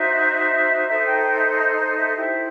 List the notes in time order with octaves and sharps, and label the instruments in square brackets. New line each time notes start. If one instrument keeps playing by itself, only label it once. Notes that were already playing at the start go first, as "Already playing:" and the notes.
Already playing: [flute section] D#4 F#4 C5 E5
D#4 A4 C5 E5
G5
G5
E5
D#5
D#5
E5
E4 G4 C5 E5